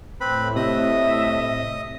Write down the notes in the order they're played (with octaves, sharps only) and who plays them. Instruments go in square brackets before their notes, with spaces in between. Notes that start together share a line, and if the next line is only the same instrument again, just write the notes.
[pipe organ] A2 [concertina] C4 B4 B5
[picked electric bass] C3 [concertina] D#5 D#6 [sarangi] E5